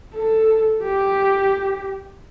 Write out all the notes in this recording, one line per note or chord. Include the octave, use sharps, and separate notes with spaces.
A4
G4